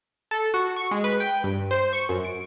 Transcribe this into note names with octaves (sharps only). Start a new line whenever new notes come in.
A4
F#4
C#6
G#3
B4
G5
G2
C5
C#6
F#2
D7